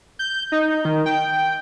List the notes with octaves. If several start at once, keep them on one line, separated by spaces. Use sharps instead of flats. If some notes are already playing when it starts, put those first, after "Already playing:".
G6
D#4
D#3
G5